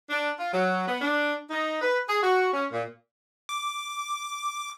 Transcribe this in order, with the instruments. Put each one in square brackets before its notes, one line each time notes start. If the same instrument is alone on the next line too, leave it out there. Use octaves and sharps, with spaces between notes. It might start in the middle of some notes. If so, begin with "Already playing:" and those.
[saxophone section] D4
F4
F#3
B3
D4
D#4
B4
G#4
F#4
C#4
A#2
[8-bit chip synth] D6